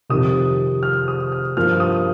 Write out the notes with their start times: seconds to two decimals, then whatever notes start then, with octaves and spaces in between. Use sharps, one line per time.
0.10 F2 C3 D#3 D#6
0.83 F6
1.08 D#6
1.32 F6
1.57 G2 F3 A#3 F6
1.80 D#6